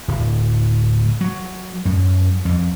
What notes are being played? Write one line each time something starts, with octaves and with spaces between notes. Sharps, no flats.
D1
F#3
F#2
F2